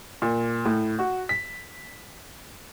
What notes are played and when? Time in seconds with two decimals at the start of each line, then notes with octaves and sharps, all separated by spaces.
0.22 A#2
0.65 A2
0.99 F#4
1.29 B6